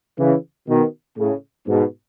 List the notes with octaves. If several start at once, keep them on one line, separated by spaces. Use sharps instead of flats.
C#3 E3
B2 D#3
A2 C#3
G#2 B2